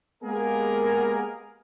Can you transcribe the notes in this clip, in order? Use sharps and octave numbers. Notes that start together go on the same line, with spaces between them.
G#3 A#3 B3 G4 G#4 A#4